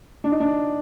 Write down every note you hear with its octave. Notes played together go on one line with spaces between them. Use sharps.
D4
D#4
D4